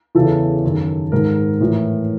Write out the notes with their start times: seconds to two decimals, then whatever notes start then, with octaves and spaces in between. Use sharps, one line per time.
0.15 E2 C#3 E3 A4
0.64 F#2 D#3
1.12 G#2 D#3 A#4
1.61 A2 E3